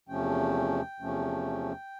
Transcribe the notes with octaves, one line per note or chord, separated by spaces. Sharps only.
E2 C3 F3 A3 C#4 G5
E2 C3 F3 A3 C#4